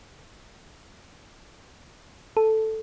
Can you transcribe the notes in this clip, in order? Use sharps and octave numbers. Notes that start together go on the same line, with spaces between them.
A4